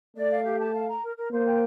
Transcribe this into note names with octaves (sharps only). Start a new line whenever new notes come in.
A3 D5
F5
G4
A5
F5
A#5
A#4
A#4
A#3 C5
G5